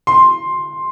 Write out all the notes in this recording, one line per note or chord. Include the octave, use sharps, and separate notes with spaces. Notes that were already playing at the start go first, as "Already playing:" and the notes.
C6